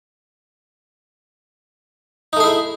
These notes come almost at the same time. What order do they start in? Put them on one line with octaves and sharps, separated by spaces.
D#4 A3 G#4 E4